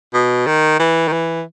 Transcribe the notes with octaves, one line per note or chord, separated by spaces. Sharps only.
B2
D#3
E3
D#3
E3